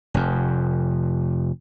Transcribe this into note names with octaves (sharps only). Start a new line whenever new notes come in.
F1 F2